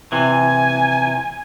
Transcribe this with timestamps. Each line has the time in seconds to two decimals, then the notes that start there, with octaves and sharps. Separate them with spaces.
0.12 C3 E3 G#5